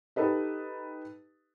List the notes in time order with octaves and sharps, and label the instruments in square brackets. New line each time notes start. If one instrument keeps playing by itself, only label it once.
[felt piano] D#4 G4 A4 B4 D#5